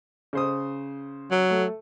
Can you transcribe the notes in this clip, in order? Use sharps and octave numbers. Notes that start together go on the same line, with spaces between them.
C#3 C5 D#6
F#3
A3